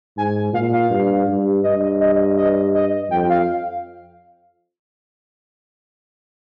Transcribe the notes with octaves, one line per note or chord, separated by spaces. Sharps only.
G#2 G#5
A#2 F5
F5
G2
G2
G2 D#5
D#5
D#5
D#5
F2 G5
F5